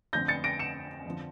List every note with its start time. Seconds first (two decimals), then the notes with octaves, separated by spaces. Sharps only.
0.13 F2 D3 F3 A3 G6 A#6
0.28 A6 C#7
0.44 A#6 D7
0.59 C#7 E7
1.06 F2 D3 F3